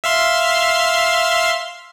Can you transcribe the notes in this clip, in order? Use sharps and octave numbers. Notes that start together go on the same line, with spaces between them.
E5 F5 C6